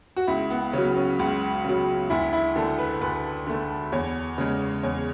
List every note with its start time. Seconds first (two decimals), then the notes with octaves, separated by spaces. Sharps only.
0.17 F#4
0.27 C#2 E4
0.50 B3
0.73 C#3 F#3 C#4
0.97 C#4
1.19 C#2
1.65 C#3 F#3
2.10 D2 E4
2.33 E4
2.56 D3 A3 A4
2.78 B4
3.01 D2 B4
3.47 D3 A3
3.92 E2 C#5
4.38 C#3 G#3
4.83 E2 C#5